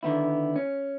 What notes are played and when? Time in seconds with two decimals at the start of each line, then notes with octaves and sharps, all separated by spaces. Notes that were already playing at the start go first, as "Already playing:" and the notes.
0.03 D3 D#3 B3 E4
0.56 C#4